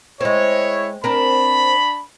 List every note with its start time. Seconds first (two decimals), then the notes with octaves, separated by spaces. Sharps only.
0.21 G#3 C4 E4 C#5
1.04 C4 D4 A#4 B5